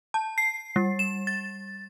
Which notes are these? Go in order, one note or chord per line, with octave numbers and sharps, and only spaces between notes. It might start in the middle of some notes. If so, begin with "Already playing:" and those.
A5
C7
G3
E7
A6